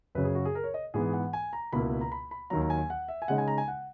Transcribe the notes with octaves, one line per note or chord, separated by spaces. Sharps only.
F#2 C#3 F#3 B4
G#4
F#4
G#4
A#4
C#5
D#5
G#2 E3 B3 G#4
F#5
G#5
A#5
C#2 B2 A#3 E4 B5
A#5
B5
B5
D#2 D#3 F#3 A#5
A#5
G#5
F#5
E5
G#5
C#3 G#3 D#4 F#5
G#5
A#5
G#5
F#5